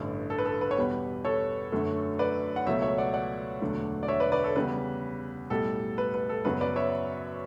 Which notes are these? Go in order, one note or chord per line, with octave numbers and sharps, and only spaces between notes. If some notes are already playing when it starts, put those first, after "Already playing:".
Already playing: A1 G2 D3 A3
A4
B4
A4
B4
C#5
E2 B2 G3 B4
A4 C#5
F#2 D3 F#3 A3
B4 D5
F#5
C#2 B2 F#3 A3 C#5 E5
C#5 E5
D5 F#5
D5 F#5
E1 D2 D3 F#3 A3
D5
C#5 E5
B4 D5
B4 D5
A4 C#5
E2 C#3 G3 B4
B1 A2 G3 A4
B4
B4
A4
F#2 C#3 F#3 B3 B4
B4 D5
C#5 E5